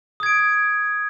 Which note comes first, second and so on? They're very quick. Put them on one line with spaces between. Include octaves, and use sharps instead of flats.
D#6 G#6 D7